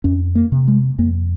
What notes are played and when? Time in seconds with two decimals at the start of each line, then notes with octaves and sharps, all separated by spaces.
0.04 F2 C#4
0.35 A#3
0.52 C3
0.68 G#3
0.98 F2 A#3